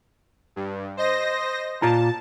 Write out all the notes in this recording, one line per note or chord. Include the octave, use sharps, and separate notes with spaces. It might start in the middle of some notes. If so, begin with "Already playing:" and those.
G2
C5 D#5 A#6
A#2 F4 A5 A#5